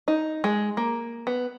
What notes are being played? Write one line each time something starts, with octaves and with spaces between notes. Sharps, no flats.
D#4
G#3
A#3
B3